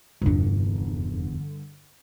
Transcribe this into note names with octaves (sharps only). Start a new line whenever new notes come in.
F1 E2 G2 D3